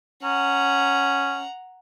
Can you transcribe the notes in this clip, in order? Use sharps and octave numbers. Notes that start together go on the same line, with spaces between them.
C#4 F#5 A#5